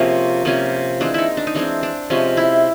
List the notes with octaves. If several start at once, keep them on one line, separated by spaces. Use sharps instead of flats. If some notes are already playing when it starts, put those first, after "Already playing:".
Already playing: C3 F3 A#3 C#4 G#4
C3 F3 A#3 C#4
E3 G#3 C4 D4
D#4 E4
D4
D#4
E3 G#3 C4 D4
D4
C3 F3 G#3 C#4
E4